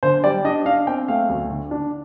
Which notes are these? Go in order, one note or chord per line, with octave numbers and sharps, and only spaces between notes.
D3 C5
G3 D5
D4 D#5
D4 F5
C4 G5
A3 F5
D2
D3
D4